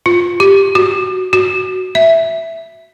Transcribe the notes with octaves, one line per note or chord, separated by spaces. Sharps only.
F4
G4
F#4
F#4
E5